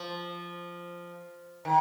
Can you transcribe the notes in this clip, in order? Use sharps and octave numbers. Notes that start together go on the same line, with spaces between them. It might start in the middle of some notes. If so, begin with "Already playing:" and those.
Already playing: F3
D#3